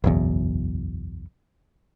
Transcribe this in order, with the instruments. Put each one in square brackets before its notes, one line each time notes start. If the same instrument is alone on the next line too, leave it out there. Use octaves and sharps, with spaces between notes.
[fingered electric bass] F#1 B1 E2